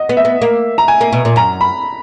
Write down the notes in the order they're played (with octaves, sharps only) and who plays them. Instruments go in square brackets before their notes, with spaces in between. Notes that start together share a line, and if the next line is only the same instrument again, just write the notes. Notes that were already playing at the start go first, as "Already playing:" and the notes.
Already playing: [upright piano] D#5 F#5
[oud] B3
[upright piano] E5
[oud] B3
A#3
[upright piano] A#5
G#5
[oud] A#3
B2
A#2
[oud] F#2 [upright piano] A#5
[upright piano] B5